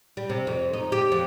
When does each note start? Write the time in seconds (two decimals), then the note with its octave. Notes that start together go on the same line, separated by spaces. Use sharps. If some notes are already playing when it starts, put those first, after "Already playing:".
0.17 G3
0.30 C3
0.47 F2
0.73 D#4
0.92 G4
1.12 F2